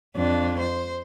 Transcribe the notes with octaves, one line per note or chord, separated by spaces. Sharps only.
F2 D4
C5